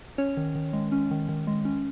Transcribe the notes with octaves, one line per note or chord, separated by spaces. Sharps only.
C#4 C#5
D#3
D#3
G#3
C#4
D#3
D#3
G#3
C#4